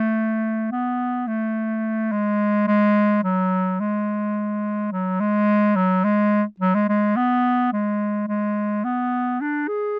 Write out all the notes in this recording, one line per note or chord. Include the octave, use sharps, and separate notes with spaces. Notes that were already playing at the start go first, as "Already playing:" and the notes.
Already playing: A3
B3
A3
G#3
G#3
F#3
G#3
F#3
G#3
F#3
G#3
F#3
G#3
G#3
B3
G#3
G#3
B3
D4
G#4